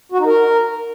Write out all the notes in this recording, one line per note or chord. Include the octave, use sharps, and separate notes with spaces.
F#4
D#4
A#4